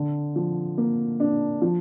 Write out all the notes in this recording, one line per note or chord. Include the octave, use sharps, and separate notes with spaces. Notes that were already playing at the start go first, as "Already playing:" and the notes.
Already playing: D3
F3
A#3
D4
F3